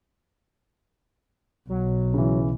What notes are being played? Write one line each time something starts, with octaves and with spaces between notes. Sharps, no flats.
B1 F#3
C#3 E3